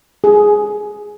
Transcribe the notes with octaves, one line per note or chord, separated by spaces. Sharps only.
G#4